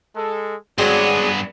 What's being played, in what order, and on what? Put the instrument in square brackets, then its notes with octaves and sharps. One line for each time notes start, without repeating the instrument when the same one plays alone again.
[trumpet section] G#3 A4
[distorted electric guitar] G2 B3 [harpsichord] F#3 G#3 C4 [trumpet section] F#4 G#4 D5